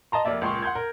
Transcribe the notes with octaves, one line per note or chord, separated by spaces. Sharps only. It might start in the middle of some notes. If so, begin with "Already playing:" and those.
D#5 A5 A#5 C6
F1 A#3 D5 E5
C#2 A#2 C6 C#6
F#5 C6 G6 G#6
A#4